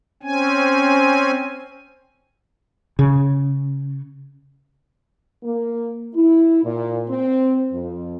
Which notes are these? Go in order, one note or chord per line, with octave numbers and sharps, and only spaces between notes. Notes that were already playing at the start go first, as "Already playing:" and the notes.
C4 C#4 G#5
C#3
A#3
E4
A#2
C4
F2